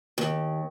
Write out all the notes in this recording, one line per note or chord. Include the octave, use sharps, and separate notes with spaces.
D#2